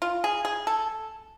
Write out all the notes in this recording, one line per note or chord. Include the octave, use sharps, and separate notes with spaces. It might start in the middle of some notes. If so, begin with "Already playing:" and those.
F4
G#4
G#4
A4